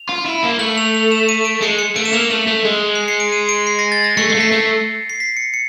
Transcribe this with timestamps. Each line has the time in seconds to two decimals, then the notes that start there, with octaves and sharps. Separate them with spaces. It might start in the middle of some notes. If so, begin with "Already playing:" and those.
Already playing: F7
0.09 F4
0.26 E4
0.43 A#3
0.59 A3 F#7
0.78 F7
0.95 F7
1.12 E7
1.29 D#7
1.45 D7
1.62 G#3 C#7
1.79 C#7
1.96 A3 D7
2.05 E7
2.13 A#3 F7
2.31 A3 F#7
2.47 A3 F7
2.64 G#3
2.95 C7
3.08 C#7
3.20 D7
3.32 D#7
3.49 D7
3.67 C7
3.79 A#6
3.92 A6
4.04 A#6
4.17 A3 C#7
4.30 G#3 C7
4.35 A3
4.40 B6
4.52 A3 C7
5.10 C7
5.20 B6
5.37 C#7
5.54 C#7